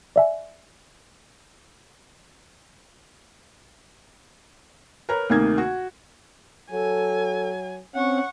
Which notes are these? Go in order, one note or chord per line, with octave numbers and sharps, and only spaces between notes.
D5 E5 G#5
A#4 B4 C#5 A#5
D2 C3 D#3 A#3 D#4 G#6
F#4
F#3 A4 G#5
C4 C#4 F#5 C#6